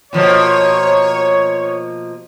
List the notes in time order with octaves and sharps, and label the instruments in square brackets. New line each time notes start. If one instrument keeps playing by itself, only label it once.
[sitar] B2 F3 A#3 [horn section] C#5